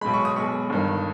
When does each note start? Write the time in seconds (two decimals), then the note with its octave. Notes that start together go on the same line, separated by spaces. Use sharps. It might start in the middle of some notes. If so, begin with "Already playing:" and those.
0.01 B1 B2 G#3 B5
0.14 C#6
0.25 D#6
0.36 B1 B2 G#3 C#6
0.70 G1 G2 D#3